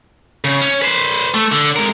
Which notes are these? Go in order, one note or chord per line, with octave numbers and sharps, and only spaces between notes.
C#3
C#4
B4 C5
A3
D3
G#3 A#4